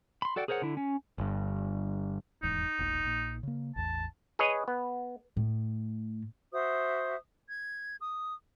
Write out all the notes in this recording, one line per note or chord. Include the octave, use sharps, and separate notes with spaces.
B5 C6
F#4 A4 D5 F#5 G5
G#4 A#4 C5 C#5 F#5
D3 E4
C#4
G1 G2
D#1 E2 G#2 D#4
E1 A#1 A#2
A#1 A#2
C#3 A#3
A1 E2 A5
G#4 B4 C#5 D#5
B3
A2
F#4 C5 E5 D#6
G#6
D#6